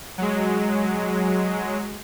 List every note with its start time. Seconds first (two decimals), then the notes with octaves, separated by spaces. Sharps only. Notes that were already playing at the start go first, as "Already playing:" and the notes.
0.18 F#3 G#3